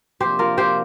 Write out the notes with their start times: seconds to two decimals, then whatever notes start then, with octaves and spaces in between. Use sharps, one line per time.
0.20 C3 F3 A#3 D4 G4 C5
0.39 F4 A#4
0.57 G4 C5